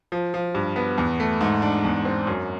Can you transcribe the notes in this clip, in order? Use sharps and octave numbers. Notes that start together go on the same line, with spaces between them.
F3
F3
G2
B3
E2
A3
G#2
D4
E2
C4
F#2